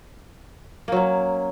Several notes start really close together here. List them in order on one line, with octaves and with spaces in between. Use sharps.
A#3 F#3 C#4